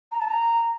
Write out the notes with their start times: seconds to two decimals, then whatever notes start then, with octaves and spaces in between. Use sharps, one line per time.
0.12 A#5
0.20 A5
0.28 A#5